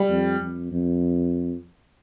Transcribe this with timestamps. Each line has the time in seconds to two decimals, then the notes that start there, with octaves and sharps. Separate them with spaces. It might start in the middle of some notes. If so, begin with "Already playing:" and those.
Already playing: G3
0.09 F2
0.40 F2
0.72 F2